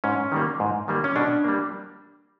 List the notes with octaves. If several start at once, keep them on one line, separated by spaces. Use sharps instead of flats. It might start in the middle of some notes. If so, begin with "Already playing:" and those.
G#2 C#4
D#3 G3 A#3
G#2
D#3 G3 A#3
C#4
B2 D4
G3 A#3